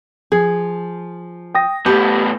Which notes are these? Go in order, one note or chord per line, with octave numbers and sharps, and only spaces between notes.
F3 G#4
G5 D#6 A#6
A2 B3 G4 A5 G6